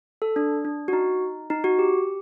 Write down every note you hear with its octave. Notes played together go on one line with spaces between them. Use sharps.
A4
D4
D4
F#4
D#4
D#4
F#4
G4